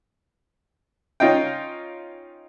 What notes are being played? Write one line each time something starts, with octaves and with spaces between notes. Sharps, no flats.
C#4 D#4 F4 D#5 G5